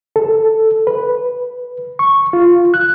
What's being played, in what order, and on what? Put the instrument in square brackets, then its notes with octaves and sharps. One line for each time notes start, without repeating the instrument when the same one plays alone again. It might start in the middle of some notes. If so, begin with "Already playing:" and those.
[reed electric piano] A4
B4
C#6
F4
F#6